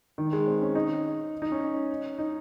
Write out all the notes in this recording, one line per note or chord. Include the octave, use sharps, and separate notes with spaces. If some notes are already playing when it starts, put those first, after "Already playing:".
D#3
G#3
C4
C#4
D#4
D#4
C#4
D#4